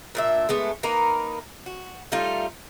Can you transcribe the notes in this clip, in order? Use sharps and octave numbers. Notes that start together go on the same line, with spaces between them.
A#2 D4 E5
G#3 A3 B3
A#3 D#4 A#4 B4
F#4
G3 A3 D#4 F4